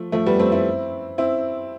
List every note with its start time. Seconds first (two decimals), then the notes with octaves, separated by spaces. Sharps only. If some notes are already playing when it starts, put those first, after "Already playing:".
Already playing: F3 A3
0.12 F3 A3
0.26 G3 B3
0.39 A3 C4
0.52 C4 E4
1.18 C4 E4